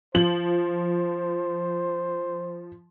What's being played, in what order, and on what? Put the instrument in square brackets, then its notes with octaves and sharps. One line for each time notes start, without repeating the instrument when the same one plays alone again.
[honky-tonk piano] F3 F#7 [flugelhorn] C5